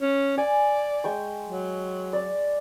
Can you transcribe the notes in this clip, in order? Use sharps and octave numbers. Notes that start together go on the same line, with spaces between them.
C#4
D5 G#5
G#3 G5 C#6
F#3
D5